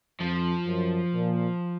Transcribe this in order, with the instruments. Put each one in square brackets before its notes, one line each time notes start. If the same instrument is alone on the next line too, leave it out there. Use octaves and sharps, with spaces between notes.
[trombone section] F2 [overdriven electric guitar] F3
[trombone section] F#2
A#2